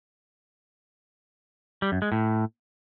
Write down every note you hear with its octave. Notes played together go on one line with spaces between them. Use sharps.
G3
F#2
G#3
A2